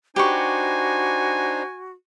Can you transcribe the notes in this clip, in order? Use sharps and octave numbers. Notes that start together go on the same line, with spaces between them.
D4 D#4 F#4 G4 B4 C5 G#5 C#6